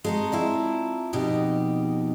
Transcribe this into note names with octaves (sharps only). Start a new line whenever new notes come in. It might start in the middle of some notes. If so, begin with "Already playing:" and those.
G#3 C4 D#4 F#4 A5 A#5
E4 F4 D5
F2 B2 D#4 G4